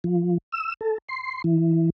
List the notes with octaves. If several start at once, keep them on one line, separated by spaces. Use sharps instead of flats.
F3
E6
A4
C6
E3